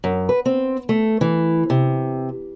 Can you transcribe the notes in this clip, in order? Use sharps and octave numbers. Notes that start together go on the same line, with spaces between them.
F#2
B4
C4
A3
E3
C3